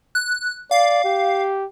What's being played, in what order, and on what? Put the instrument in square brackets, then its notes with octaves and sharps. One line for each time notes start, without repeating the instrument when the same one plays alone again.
[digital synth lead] F#6
[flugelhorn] D5 [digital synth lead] F5
[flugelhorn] G4